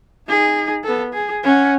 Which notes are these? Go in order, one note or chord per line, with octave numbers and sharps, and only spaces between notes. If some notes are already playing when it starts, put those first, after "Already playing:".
D#4 G#4
B3 A4
G#4
C#4 F#5